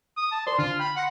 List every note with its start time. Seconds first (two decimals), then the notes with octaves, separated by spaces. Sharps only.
0.17 D#6
0.32 A5
0.47 A#4 C5 D5 C6
0.59 D3 F4
0.80 G5 B5 F6
0.96 F#5 B5 C6 A#6